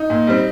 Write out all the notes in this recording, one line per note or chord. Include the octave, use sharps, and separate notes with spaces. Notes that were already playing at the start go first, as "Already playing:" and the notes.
Already playing: D#4
A#2
G3 C4